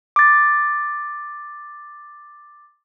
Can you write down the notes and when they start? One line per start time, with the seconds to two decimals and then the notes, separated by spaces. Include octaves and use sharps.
0.16 D6 A6